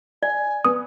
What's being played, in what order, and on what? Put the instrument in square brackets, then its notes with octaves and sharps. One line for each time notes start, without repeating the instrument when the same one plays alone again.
[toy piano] D5 [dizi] G#5
[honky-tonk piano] B3 [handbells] D#6